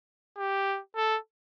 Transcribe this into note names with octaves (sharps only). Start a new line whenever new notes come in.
G4
A4